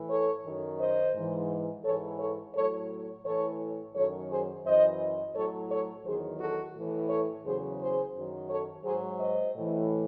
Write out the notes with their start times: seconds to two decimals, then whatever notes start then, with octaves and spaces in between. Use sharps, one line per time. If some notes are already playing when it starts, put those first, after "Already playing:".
Already playing: A2 E3
0.09 A4 C#5
0.45 F#2 D#3 F#3
0.79 C5 D#5
1.15 G#2 E3
1.84 G#2 E3 A4 C#5
2.20 A4 C#5
2.55 A2 F#3 A4 C#5
3.25 A2 E3 A4 C#5
3.95 F#2 D#3 F#3 A4 C#5
4.31 G#4 C5
4.65 F#2 E3 C5 D#5
5.35 A2 F#3 A4 C#5
5.70 A4 C#5
6.05 E2 D#3 F#3 G#4 C5
6.40 F#4 A4
6.76 A2 E3
7.10 A4 C#5
7.45 E2 C#3 F#3 G#4 C5
7.80 G#4 C5
8.15 F#2 D#3 F#3
8.50 A4 C#5
8.85 G#2 F#3 G#4 C5
9.20 C5 D#5
9.56 A2 E3